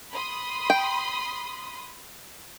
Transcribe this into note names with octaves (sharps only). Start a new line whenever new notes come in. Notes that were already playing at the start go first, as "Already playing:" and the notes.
B5 C6 D#6
G5